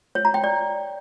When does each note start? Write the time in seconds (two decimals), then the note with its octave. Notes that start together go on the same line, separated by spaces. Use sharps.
0.15 C#5
0.25 A#5
0.34 G5
0.44 D5